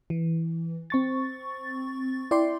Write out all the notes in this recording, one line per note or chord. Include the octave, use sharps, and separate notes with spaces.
E3
C4 C#6 A6
E4 D5 G5 C6